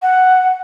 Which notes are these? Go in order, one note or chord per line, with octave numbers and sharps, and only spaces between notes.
F#5